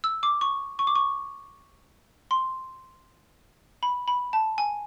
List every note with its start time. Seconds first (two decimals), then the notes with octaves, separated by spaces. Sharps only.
0.04 E6
0.23 D6
0.41 C#6
0.79 C#6
0.87 D6
0.95 C#6
2.31 C6
3.83 B5
4.08 B5
4.33 A5
4.58 G#5